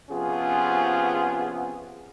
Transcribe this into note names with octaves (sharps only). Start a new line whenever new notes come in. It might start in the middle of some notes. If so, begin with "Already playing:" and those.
C3 F3 B3 C#4 F4 G#4